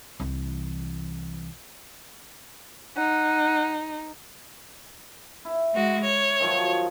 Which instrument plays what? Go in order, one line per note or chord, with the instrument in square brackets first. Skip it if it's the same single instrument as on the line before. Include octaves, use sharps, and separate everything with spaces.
[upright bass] C2 E3
[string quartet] D#4 [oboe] F#5
[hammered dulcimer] E4
[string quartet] G#3 F#4
C#5
[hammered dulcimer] D#3 F3 F#3